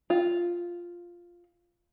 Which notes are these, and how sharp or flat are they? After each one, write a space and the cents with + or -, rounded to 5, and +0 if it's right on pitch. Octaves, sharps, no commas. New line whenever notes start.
F4 +0